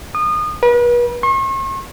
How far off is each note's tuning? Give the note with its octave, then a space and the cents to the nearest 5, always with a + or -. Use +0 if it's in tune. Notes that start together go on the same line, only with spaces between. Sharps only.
D#6 -30
B4 -40
C#6 -45